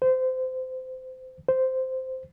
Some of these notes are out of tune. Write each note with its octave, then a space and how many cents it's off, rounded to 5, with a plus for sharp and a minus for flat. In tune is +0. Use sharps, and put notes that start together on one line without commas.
C5 -25
C5 -10